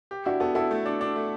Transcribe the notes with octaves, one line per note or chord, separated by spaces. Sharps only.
G4
D4 E4 F#4
B3 F#4 A4
E4 F#4 A4
A3
D4
D4
A3